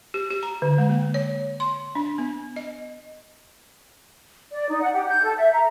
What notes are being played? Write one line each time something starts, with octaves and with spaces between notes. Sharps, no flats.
G4
G4
A#5
D3
G#3
A#3
C#5
C6
D4
B3
D#5
D5
D#4
F#5
G4
G6
A4
E5
A#5